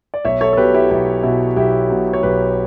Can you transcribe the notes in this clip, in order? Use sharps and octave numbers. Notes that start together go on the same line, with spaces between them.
D5
B1 C#5 E5
A4 C#5
A4
B2 F#3 G4 B4
E4 G4
B1 E4
B2 F#3 E4
B1 E4 G4
B2 F#3
C#5
B1 G4 B4